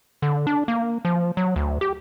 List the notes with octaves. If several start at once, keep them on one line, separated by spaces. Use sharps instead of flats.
D3
D4
A#3
F3
F#3
D2
G4